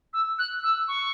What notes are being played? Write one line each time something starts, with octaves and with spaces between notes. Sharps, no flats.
E6
F#6
E6
C#6